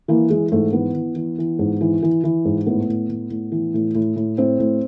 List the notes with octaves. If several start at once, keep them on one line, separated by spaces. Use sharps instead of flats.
E3 A#3
E3 G#3
G#2 A3
E3 B3
E3
E3
E3
G#2
E3
E3
E3
G#2
A2 B3
A2
A2
A2
E3
A2
A2
A2
A2 C4
A2